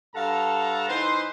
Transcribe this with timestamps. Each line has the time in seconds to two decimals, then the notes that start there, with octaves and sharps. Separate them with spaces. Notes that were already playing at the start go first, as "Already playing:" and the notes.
0.15 G2 A4 F5 F#5 A5 A#5
0.89 E3 D#4 B4 C5